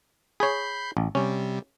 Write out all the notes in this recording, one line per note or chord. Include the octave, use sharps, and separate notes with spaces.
G#4 C#5 B5 G6 C7
A1
C3 G3 C#4